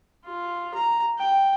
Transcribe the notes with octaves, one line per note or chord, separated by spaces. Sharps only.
F4
A#5
G5